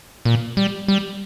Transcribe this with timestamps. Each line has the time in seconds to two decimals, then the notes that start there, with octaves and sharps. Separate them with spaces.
0.25 A#2
0.57 G3
0.88 G3